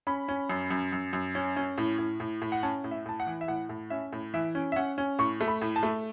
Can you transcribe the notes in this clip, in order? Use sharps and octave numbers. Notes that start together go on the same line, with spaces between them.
C#4 B5
C#4
F#2
F#2
F#2
F#2
C#4
C#4
A2
A2
A2
A2
F#5
C#4 A5
A2
E5
A2 A5
F#5
E3
E5
A2 F#5
A2
C#4 E5
A2
E3 E5
C#4
E5
C#4 F#5
C#4
A2 C#6
A3
B5
A2
A5
A3